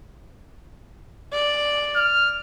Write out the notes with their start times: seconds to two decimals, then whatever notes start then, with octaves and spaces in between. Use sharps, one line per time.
1.32 D5
1.96 F6